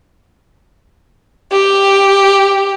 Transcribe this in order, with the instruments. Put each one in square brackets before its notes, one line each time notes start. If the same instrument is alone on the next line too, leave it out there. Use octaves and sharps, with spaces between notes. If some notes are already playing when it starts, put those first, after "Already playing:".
[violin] G4